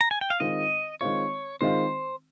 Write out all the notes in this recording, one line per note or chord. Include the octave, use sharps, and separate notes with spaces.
A#5
G#5
G5
F5
D#3 G#3 C4 F4 D#5
D#3 G#3 C4 F4 C#5
D#3 G#3 C4 F4 C5